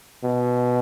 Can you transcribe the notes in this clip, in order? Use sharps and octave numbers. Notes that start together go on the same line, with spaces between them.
B2